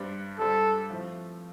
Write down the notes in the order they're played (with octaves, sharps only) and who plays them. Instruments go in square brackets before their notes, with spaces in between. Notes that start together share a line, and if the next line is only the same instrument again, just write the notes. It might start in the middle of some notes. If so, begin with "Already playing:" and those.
Already playing: [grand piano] G2 G3 D4 G4 C5
[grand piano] G2 G3 D4 G4 C5 [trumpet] A4
[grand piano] A2 F3 A3 C4